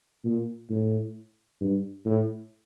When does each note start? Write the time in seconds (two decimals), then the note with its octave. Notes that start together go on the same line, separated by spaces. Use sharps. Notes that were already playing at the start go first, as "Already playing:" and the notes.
0.24 A#2
0.70 A2
1.61 G2
2.05 A2